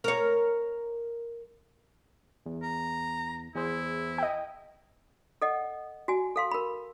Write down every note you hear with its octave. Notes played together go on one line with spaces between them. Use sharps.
A#4 C#5
E2
A#5
E2 E4 G#4 C5
D#5 G5
A4 D#5 F#5
F#4 G#5
A4 F5 C6
A#4 B5